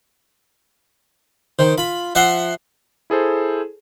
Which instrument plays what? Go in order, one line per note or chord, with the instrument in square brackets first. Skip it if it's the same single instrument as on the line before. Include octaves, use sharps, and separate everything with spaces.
[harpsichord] D#3 [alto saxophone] C5
[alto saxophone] F4 [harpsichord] B5
[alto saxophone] F3 [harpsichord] E5 F#5 C6
[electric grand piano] E4 G#4 A4 C5